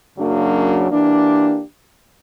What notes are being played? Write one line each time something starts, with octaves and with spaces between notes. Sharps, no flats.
F#2 C#3 F#3 A#3 D4
E3 A#3 D4 G4